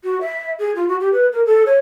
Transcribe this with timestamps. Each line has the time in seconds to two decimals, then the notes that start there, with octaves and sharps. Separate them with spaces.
0.04 F#4
0.21 E5
0.59 G#4
0.75 F4
0.88 F#4
1.00 G4
1.13 B4
1.32 A#4
1.46 A4
1.66 C#5